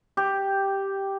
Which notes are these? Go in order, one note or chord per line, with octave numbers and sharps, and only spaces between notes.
G4